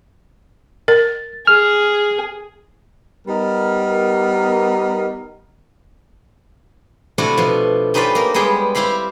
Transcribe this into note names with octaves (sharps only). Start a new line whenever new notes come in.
A#4 A6
G#4 F6
G3 B3 D#4 A#4
C3 A3 D4 E4 F#4
B2 F3
C#4 D#4 G4 B4 C5 D5
A#3 A#4
G3 G#3 B3 G#4 G5
C4 E4 G4 F5 B5